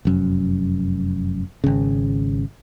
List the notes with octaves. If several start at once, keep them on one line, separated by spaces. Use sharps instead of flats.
F1 F#2
G#1 C#3